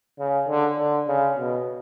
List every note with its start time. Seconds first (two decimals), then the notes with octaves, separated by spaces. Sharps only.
0.19 C#3
0.48 D3
0.79 D3
1.08 C#3
1.37 B2